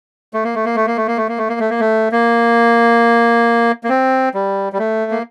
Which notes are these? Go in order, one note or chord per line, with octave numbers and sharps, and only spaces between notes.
A3
A#3
A3
A#3
A3
A#3
A3
A#3
A3
A#3
A3
A#3
A3
A#3
A3
A#3
A#3
C4
G3
G3
A3
A#3